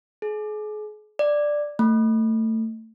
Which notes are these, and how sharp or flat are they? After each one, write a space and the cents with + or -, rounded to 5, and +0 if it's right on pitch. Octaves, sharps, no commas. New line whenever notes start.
G#4 +35
D5 +5
A3 +25